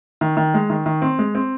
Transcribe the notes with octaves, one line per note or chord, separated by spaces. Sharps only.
D#3
D#3
G#3
D#3
D#3
C4
G#3
C4